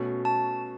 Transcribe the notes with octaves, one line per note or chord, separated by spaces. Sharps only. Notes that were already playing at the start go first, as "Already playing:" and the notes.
Already playing: B2 A3 C#4 F#4
A5